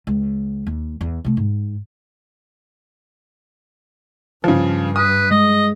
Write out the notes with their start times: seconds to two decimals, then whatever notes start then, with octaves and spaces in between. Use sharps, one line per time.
0.07 C#2
0.67 D#2
1.01 E2
1.24 C3 A3
1.37 G#2
4.44 G2 C#3 F3
4.96 B4 D#6
5.31 G#3 D#5